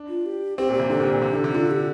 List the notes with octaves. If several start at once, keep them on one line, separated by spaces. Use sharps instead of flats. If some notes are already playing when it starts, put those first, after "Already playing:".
Already playing: D4
F4
G4
C4 G4
A#2
G4
C3
D3 G4
A#2
A#2
C3
D3
C3
D3 F4
G4